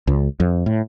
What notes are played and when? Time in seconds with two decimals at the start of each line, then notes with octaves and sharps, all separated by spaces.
0.07 C#2
0.40 F2
0.66 A2